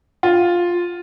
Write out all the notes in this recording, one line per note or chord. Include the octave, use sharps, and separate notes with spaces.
F4